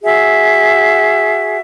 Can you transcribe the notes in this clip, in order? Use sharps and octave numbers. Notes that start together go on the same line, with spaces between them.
F#4 G#4 E5